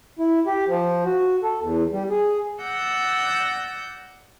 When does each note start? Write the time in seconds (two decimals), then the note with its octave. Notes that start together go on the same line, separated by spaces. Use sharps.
0.19 E4
0.47 G4
0.68 F3
1.05 F#4
1.43 A4
1.60 E2
1.92 G3
2.10 G#4
2.61 D5 F#5 E6 G6 A#6